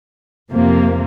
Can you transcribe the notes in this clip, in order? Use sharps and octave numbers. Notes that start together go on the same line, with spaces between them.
F2 C3 F3 A#3